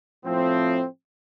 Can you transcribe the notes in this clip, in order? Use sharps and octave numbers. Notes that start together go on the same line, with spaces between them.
A2 F3 A3 C4